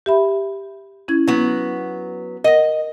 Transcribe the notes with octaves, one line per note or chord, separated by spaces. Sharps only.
G4 E5 B5
C#4 E4 G#6
F#3 B3
A#4 D#5 F#5 A#6